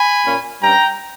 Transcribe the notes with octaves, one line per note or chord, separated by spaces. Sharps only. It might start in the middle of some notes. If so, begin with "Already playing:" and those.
Already playing: G#5 B5
A#2 A#3 C#4
G2 G3 C#4 G5 A#5